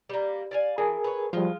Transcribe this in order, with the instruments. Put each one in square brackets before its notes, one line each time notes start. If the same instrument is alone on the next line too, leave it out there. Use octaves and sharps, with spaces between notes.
[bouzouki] G3 A#3
D5 F5 G#5
[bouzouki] E3 [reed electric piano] G#4 A#4 G#5
[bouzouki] B4 C#5
[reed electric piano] F3 G3 [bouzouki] G#3 F4